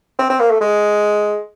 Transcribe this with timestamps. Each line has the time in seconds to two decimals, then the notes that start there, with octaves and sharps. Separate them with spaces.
0.19 C4
0.30 C4
0.40 A#3
0.50 A3
0.61 G#3